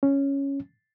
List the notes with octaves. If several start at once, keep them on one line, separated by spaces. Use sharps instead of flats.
C#4